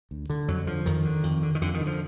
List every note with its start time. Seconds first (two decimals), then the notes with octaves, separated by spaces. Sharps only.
0.11 D2
0.30 D3
0.48 F2 F#3
0.67 D3 F3
0.86 F2 D#3
1.05 D3
1.23 F2
1.43 D3
1.55 D#3
1.62 F2 D3
1.74 D#3
1.80 D3
1.87 F3